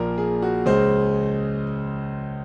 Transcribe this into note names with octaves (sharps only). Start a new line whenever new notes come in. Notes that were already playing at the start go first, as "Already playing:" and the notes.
Already playing: A#1 A#2 F3 A#3 A#4
G#4
F#4
C#2 C#3 G#3 C5